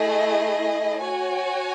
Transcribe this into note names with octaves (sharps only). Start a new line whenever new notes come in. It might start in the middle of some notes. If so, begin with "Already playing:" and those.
Already playing: A3 E4 G#4 D#5
F#4 C#5 G#5